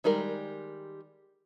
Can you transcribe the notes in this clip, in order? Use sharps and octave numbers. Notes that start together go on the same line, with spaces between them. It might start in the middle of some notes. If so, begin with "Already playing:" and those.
D#3 G3 G#3 A#4